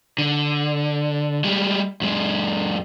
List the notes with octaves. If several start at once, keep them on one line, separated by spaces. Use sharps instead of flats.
D3
G3 G#3
F#2 G#3